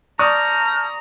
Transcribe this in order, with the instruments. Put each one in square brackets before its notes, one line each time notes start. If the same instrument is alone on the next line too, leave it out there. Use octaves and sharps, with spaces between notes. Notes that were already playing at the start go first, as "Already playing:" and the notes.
[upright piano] D5 C#6 D#6 [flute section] A5 F6 G6 [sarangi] A#5